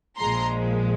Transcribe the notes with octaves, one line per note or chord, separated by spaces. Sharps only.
A#1 A#2 F3 G#3 A#5 C6